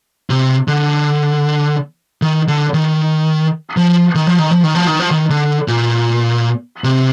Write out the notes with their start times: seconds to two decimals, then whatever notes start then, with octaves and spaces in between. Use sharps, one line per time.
0.30 C3
0.68 D3
2.22 D#3
2.48 D3
2.74 D#3
3.77 F3
4.15 D#3
4.27 F3
4.39 D#3
4.51 F3
4.63 D#3
4.75 F3
4.87 D#3
5.00 F3
5.11 D#3
5.30 D3
5.68 A#2
6.84 C3